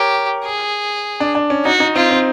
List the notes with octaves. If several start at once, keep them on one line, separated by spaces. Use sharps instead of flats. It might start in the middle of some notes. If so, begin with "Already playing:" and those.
Already playing: G4 A#4 C#5
G#4
D4
D4
C#4
D#4 F#4
D#4
C4 F4
C4